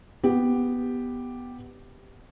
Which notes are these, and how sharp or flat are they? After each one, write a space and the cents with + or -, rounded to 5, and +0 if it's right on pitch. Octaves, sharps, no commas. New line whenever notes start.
B3 +0 G4 +0